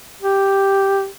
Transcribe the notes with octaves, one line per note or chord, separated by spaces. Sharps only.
G4